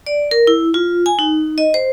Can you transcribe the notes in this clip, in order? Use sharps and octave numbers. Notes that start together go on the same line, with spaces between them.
D5
A#4
E4
F4
G#5
D#4
D#5
C5